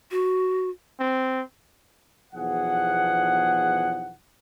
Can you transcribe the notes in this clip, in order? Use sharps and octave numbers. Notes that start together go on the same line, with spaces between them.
F#4
C4
B1 E2 F3 G#4 F#5